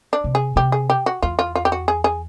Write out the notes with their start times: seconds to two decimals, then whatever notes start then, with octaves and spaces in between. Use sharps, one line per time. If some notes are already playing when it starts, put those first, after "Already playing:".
0.13 D4
0.24 C3
0.35 G#4
0.56 C3 G4
0.72 G#4
0.90 G4
1.06 F#4
1.22 E2 F4
1.39 F4
1.55 F4
1.65 G4
1.72 F#4
1.88 G#4
2.04 G#4